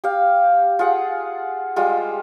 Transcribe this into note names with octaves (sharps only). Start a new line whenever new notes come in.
G4 F5
F4 G#4 F#5
G3 G#3 F4